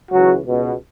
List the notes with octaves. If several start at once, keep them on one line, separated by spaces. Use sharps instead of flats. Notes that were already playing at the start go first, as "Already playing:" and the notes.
C#2 C#3 E3 F#3 F#4
C#2 B2